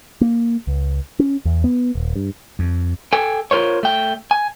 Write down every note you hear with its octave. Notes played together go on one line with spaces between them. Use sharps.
A#3
C#2
C#4
E2
B3
D#1
G2
F2
A4 G5 G#5
F4 A#4 C5 C#5
A3 G5
G#5